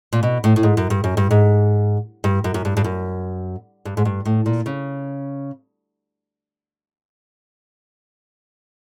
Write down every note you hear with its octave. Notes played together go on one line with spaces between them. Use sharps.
A#2
B2
A2
A2
G#2
F#2
G2
F#2
G2
G#2
G2
F#2
F#2
G2
G2
F#2
G2
G#2
G2
A2
A#2
C#3